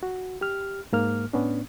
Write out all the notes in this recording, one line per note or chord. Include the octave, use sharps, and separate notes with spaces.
F#4
G4 F6
G#2 A#3 F6
A2 B3 C#4 D4